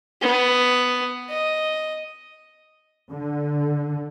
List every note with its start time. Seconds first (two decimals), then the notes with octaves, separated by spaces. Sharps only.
0.22 B3
1.30 D#5
3.11 D3